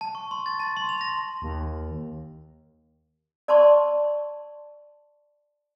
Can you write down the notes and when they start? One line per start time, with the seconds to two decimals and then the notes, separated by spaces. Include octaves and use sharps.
0.01 A5
0.15 C#6
0.31 C6
0.46 A6
0.60 A5
0.77 C6
0.89 F7
1.01 A#6
1.42 D#2
3.48 D5 A5 C6 C#6